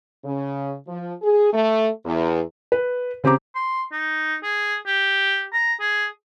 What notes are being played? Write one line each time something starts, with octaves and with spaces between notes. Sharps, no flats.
C#3
F3
G#4
A3
E2
B4
C#3 C4 G4 A#5 D6
C6
D#4
G#4
G4
A#5
G#4